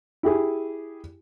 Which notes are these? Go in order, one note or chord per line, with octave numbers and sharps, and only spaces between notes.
E4 G4 G#4